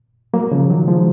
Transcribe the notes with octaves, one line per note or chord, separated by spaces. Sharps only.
F#3 A#3
C#3 F3
D#3 F#3
F3 G#3